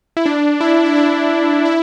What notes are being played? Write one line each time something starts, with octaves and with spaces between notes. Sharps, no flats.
E4
D4
E4
E4
D4
E4